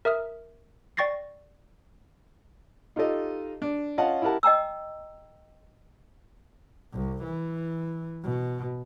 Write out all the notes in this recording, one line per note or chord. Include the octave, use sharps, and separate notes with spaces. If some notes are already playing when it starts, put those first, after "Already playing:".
A#4 E5 D#6 F6
D5 G5 C#6 A6 A#6 C7
D#4 F4 G4 A4 D#5
D4
C#4 F4 D#5 F5 F#5 A5
E4 G4 A#4 F#5 A5
D#5 G5 A#5 E6
C2
E3
B2